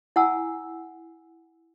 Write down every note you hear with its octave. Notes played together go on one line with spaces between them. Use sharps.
E4 F#5 G#5 A5 E6